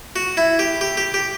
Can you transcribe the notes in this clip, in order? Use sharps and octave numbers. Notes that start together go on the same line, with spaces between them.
F#4
E4
G4
G4
G4
G4